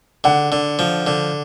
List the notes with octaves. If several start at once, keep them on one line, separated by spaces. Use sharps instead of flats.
D3 F#5
D3
F3
D3